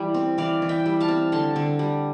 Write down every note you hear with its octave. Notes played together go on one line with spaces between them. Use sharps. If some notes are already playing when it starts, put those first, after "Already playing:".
Already playing: E3 G3 D5
C4
E3 D5 F5
E3
E5 G5
G3
F5 A5
C4
D3 A5 C6
D3
G3